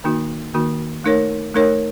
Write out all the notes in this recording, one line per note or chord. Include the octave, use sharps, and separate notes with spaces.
D#3 A#3 D#4 F#4
D#3 A#3 D#4 F#4
A3 D#4 A#4 C#5
A3 D#4 A#4 C#5